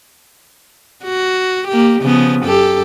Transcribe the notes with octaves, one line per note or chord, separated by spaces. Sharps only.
F#4
A#3 G4
C#3 F3 B3
F#2 G4 A4